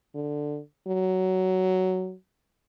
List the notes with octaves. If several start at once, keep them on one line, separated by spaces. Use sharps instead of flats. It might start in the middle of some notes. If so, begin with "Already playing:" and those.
D3
F#3